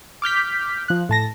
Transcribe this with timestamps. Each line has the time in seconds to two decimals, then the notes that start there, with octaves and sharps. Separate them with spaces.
0.22 D6 F6 G6 B6
0.88 F3 F#6
1.09 A2 A5 A#6